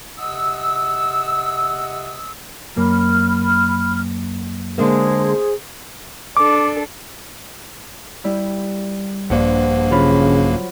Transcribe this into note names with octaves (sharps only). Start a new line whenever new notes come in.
C3 D#5 F#5 D#6 E6
F#2 A#3 B5 F6
D3 G#3 A#3 G#4 C5
D4 A4 D6
G3 E4
A#1 G2 G3 A#3 C5 F#5
C#3 F#3 F4 B5